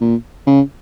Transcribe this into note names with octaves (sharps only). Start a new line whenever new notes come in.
A#2
C#3